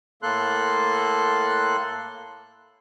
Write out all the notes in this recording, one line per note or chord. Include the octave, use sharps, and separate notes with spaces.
A2 A#3 A4 C6 F#6